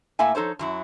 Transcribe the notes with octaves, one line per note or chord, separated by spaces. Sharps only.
A2 A#3 A4 E5 G#5
F3 D#4 A4 C5 C#5
F#2 F#3 E4